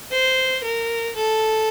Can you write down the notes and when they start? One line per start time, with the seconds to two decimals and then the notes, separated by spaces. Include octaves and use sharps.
0.11 C5
0.64 A#4
1.15 A4